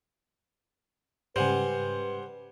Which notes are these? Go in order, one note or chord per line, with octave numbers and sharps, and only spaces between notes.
G#2 C#3 G3 B4 C5 F#5 G#5